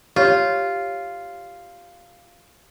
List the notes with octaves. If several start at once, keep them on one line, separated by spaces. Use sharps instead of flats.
F4 G4 C#5